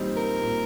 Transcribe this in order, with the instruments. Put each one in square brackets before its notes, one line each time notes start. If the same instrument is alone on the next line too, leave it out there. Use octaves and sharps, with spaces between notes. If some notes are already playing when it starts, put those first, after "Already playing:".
Already playing: [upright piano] A#2 G3 C4 D#4
[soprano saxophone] A#4
[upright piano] A#2